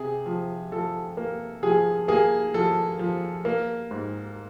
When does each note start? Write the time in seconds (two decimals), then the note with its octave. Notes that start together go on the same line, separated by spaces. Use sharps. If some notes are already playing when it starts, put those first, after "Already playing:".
Already playing: C3 G#4
0.26 F3
0.72 F3 A4
1.17 A#3
1.63 F3 G#4
2.08 A#3 G#4
2.54 F3 A4
2.99 F3
3.45 A#3
3.91 G#2